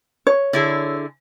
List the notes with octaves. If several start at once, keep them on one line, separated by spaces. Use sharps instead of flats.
C#5
D3 E4 G#4